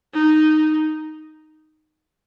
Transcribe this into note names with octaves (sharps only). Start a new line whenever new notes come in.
D#4